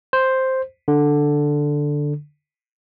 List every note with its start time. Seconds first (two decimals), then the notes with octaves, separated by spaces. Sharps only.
0.13 C5
0.88 D3